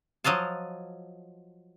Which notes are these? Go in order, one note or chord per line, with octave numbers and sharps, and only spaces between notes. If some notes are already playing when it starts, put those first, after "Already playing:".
F3 F#3 D#5 F5 A5